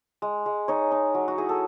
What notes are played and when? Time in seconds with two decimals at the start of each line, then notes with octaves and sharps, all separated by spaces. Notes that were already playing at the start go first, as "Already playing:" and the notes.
0.22 G#3
0.46 G#3
0.68 D#4 C#5
0.92 D#4
1.14 F#3
1.28 F#4
1.37 E4 G#4
1.49 A4